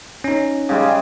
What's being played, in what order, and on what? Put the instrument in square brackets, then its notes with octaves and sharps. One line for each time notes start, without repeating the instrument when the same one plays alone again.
[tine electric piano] C#4 D#4
[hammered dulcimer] C#3 G3 G#3